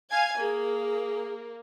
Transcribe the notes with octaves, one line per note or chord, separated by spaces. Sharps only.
F5 G#5 G#6
A#3 G#4